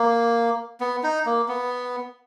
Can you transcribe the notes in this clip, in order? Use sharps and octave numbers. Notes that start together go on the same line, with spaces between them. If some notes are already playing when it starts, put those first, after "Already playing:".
Already playing: A#3
B3
D#4
A#3
B3